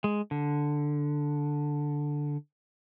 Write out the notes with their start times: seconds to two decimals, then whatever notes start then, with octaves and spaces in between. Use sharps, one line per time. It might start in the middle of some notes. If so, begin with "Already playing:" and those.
0.04 G#3
0.31 D3